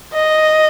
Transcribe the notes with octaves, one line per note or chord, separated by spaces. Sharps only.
D#5